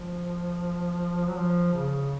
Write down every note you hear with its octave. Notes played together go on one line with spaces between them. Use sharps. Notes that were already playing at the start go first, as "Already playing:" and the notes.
Already playing: F3
F#3
F3
C#3